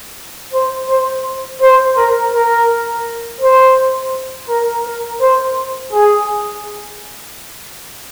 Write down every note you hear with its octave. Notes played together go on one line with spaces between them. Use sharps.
C5
C5
C5
A#4
A#4
C5
A#4
A#4
C5
G#4